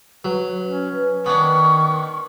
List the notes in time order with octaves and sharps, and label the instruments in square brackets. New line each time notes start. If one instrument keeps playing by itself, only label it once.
[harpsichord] F#3 [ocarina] B4
[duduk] C#4
[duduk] D#3 [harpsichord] B3 D4 [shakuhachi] C#6